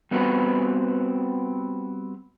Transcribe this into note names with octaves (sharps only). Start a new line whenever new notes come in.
G3 B3 C4 F#4 B4